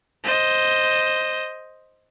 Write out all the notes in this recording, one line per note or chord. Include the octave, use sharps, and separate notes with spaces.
C5 D#5